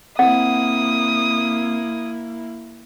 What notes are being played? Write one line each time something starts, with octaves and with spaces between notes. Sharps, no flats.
A#3 C4 E4 F#5 D#6